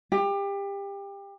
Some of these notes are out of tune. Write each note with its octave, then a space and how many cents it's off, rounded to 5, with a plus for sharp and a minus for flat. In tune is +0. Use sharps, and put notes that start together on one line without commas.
G4 +25